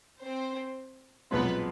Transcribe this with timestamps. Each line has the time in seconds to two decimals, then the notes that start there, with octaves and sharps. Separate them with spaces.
0.22 C4 C5
1.31 B1 A#2 F3 G#3 B3 C4 B4